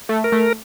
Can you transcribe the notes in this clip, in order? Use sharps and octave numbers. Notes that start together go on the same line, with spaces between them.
A3
A#4
A3